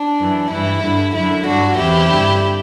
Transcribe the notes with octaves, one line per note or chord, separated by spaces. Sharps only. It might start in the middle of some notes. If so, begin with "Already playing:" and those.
Already playing: D4
F#2 E3
G2 E3 E4
G2 D3
F#2 D3 E4
G2 D3 D4 F#4
E2 C3 E3 E4 G4
G2 D3